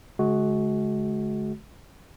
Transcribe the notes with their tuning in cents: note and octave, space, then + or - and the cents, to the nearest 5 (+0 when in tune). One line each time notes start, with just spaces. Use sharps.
D3 -40 G#3 +35 F#4 +0